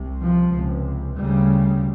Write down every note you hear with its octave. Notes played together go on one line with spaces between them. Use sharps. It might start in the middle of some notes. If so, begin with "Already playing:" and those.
Already playing: C2 C3
F3
C#2 C3
D2 C#3 G3